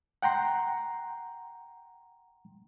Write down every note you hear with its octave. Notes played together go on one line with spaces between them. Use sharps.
F#5 G5 A#5 C6